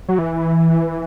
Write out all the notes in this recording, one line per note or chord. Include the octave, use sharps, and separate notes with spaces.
F#3
E3